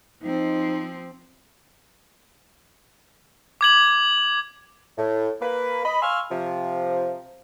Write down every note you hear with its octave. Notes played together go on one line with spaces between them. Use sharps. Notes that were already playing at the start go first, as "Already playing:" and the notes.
F3 C4 D#4
D6 G#6 F#7
A2
A#3 B4
D#5 B5
F5 G#5 C6 C#6 E6 F6
C3 F3